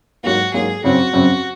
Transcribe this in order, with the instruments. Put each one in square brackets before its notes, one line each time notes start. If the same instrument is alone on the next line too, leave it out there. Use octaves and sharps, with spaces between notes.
[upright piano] G#2 F#3 A#3 [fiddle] F#4
[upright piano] G#2 F#3 A#3 [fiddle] G#4
[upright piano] F#2 C#3 F#3 C4 [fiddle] F#4
[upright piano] F#2 C#3 F#3 C4